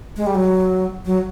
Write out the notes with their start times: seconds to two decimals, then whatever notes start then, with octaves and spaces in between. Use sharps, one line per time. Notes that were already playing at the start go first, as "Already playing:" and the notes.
0.17 G#3
0.26 G3
0.35 F#3
1.05 F#3